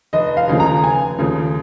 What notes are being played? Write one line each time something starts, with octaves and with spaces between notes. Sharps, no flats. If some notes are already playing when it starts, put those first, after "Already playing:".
F1 D#5
F5
D#2 C#3 F3 A3
A#5
F1 G#5
D#2 C#3 F3 A3